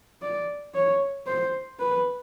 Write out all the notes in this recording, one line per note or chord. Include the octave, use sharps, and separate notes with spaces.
D5
C#5
C5
B4